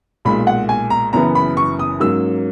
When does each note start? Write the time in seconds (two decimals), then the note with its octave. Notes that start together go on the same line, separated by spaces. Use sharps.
0.25 B1 A#2 G#3 B5
0.47 F#5
0.69 G#5
0.90 A#5
1.13 F#1 F#2 E3 B3 A#5
1.35 B5
1.57 C#6
1.79 D#6
2.00 G#2 F#3 A#3 C#4 E6